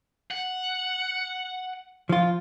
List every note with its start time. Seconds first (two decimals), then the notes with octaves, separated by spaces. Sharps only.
0.31 F#5
2.09 F3 F4